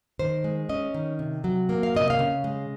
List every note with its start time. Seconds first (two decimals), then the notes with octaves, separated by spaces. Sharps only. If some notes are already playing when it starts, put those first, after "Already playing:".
0.19 D#3 C5
0.44 G#3
0.69 C#4 D#5
0.94 D#3
1.19 C3
1.44 F#3
1.69 A#3
1.83 F5
1.95 C3 D#5
2.10 F5
2.19 C#3
2.44 G#3